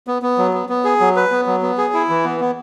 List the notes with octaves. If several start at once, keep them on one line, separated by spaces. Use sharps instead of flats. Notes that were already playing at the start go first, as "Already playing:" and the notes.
B3
B3
F#3
B3
B3
G#4
F#3
B4
B3
F#3
B3
G#4
E4
E3
B3
B3